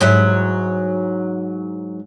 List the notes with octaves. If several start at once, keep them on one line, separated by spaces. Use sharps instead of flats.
G#2 F#3 E4